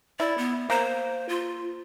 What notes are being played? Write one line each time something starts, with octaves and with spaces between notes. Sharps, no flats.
E4 D5
B3
A#3 C5
F4